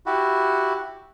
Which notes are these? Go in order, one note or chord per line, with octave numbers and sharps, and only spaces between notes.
E4 F#4 G4